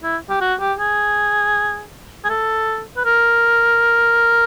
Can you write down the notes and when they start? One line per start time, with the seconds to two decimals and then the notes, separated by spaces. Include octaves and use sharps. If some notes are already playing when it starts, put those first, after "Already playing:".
0.03 E4
0.29 G4
0.41 F#4
0.60 G4
0.79 G#4
2.24 G#4
2.29 A4
2.97 B4
3.05 A#4